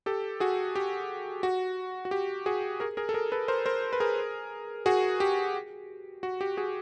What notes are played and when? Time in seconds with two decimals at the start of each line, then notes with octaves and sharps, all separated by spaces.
0.06 G4 A4
0.40 F#4 G#4
0.75 G4
1.43 F#4
2.05 F#4
2.11 G4
2.46 F#4 G#4
2.80 G#4 A#4
2.97 G#4 A#4
3.09 A4
3.14 G#4 A#4
3.32 A4 B4
3.48 A#4 C5
3.66 A#4 C5
3.93 B4
4.00 G#4 A#4
4.86 F#4 G#4
5.20 G4
6.23 F#4
6.41 G4
6.57 F#4 G#4